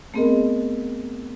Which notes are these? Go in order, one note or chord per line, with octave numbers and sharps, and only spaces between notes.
A3 B3 C4 G#4 A#4 D#5